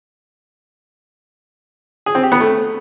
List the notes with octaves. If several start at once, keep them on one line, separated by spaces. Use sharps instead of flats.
G#4
C4
G4
B3
A3